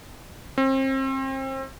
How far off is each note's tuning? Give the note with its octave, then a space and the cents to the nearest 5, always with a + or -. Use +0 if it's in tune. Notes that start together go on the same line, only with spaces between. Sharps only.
C4 +35